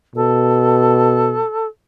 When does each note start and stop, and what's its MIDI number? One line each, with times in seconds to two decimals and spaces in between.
0.16 1.43 47
0.16 1.68 69